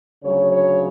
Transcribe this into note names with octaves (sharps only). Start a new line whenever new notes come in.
D2 C#3 F#3 C#5
C#5